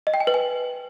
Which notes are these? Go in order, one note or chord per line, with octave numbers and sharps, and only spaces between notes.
D#5
G5
G#5
B4
G#5